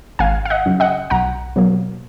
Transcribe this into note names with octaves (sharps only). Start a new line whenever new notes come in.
G#1 F5 G#5
F5
D#5 F#5
F#2 C#3
D#5 F#5
B1 F#5 A#5
B2 F#3 A#3